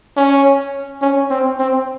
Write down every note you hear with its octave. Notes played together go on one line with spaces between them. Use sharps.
C#4
C#4
C4
C4